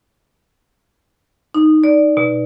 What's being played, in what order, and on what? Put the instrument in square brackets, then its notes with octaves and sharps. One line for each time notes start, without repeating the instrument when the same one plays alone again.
[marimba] D#4
D5
B2